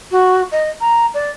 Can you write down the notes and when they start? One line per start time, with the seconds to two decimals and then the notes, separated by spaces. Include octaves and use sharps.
0.11 F#4
0.52 D#5
0.81 A#5
1.14 D5